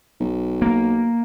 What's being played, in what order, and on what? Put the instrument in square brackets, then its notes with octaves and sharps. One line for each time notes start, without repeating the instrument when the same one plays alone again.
[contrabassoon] B1
[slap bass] A#3